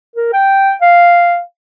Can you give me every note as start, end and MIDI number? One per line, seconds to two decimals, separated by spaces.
0.16 0.31 70
0.33 0.73 79
0.82 1.38 77